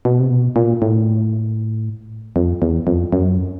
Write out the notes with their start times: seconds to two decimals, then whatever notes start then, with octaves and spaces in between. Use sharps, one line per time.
0.05 B2
0.20 C3
0.31 B2
0.56 A#2
0.82 A2
2.36 F2
2.62 E2
2.87 F2
3.13 F#2